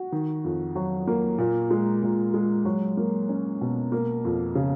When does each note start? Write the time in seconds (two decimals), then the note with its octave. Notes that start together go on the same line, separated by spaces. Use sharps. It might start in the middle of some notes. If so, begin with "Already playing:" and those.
Already playing: F#4
0.12 D#3
0.44 F2
0.75 F#3
1.07 A#3
1.38 A#2
1.71 G#3
2.03 A#2
2.34 G#3
2.65 F#3
2.97 A#3
3.29 C#4
3.61 B2
3.92 A#3
4.25 F2
4.55 C#3